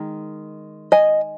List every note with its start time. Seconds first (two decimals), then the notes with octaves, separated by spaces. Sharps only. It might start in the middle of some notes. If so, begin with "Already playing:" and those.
Already playing: D#3 G#3
0.92 D#5 G#5